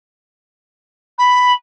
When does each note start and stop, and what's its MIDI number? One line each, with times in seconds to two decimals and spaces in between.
1.18 1.52 83